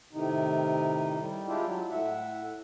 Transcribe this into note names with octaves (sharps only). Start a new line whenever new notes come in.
A2 C3 D#3 D#4
G3
G#3 D4 E4 F4 G4
F#3
A2 E5 F#5